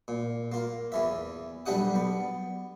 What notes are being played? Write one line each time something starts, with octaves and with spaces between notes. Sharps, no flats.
A#2
A#3 F4
E2 E3 E5
B1 G3 D4 G4 F#5 D#6
B3